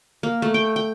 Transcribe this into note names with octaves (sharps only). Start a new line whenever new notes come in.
A#3
A3
G5
G5